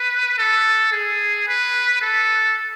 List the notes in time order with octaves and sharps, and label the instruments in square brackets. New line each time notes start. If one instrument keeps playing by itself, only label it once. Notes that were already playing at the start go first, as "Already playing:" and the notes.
Already playing: [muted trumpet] B4
A4
G#4
B4
A4